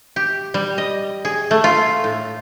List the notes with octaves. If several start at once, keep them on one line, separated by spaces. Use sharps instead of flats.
G4
G3
D#5
G#4
A3
F4
A2